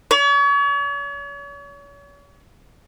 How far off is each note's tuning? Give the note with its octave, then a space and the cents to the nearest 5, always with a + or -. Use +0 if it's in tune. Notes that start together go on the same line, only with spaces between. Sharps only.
C#5 +40